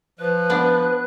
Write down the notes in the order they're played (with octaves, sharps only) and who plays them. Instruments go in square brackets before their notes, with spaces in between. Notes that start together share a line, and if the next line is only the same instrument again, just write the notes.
[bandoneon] F3 [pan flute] B4 [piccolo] F#6
[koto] B3 D4